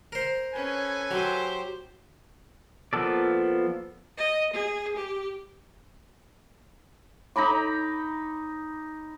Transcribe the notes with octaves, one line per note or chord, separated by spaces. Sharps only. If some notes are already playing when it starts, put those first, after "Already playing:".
A#4 C5
C#4 A4 B4 G#5
F#3 G4 C5
F3 A#3 B3 A4 D5
D#5
G#4
G4
D#4 A#5 B5 D6